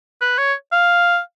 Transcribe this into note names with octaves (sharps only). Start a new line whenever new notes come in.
B4
C#5
F5